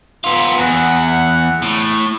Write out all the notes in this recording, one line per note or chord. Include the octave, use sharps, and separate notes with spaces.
B3 F4
E2 F#5
A2